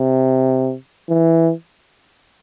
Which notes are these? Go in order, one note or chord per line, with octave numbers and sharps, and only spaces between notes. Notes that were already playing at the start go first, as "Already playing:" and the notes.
Already playing: C3
E3